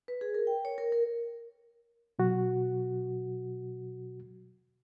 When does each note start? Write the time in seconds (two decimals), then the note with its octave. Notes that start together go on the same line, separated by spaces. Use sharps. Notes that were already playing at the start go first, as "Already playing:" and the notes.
0.08 B4
0.21 G#4
0.34 A#4
0.47 G5
0.65 C#5
0.78 A#4
0.92 A#4
2.19 B2 F#3 F#4